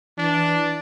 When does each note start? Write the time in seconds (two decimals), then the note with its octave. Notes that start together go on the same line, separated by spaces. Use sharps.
0.18 E3 D4